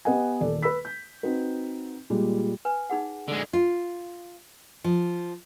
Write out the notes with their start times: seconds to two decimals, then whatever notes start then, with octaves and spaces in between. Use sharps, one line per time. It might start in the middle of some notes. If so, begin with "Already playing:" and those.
0.05 B3 G4 B4 D#5 F#5 G#5
0.41 D#1 A4 D5
0.62 B4 B5 E6 B6
0.85 G6
1.23 C4 D#4 F#4 B4
2.10 A#2 G3 G#3
2.65 B4 G#5
2.90 D#4 G#4 F#5
3.28 D3 G#3
3.53 F4
4.84 F3